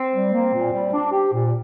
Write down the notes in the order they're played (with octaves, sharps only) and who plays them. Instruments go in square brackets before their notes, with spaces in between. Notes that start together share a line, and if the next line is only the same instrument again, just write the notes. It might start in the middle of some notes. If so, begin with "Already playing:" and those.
Already playing: [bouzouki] C4
[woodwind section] G3
A#3
A#2
G3
D4
G4
A#2